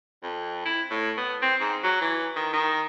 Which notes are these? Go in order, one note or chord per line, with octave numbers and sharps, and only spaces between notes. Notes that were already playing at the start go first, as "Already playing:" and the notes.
F2
E4
A2
B3
C4
G#2
F#3
E3
D#3
D#3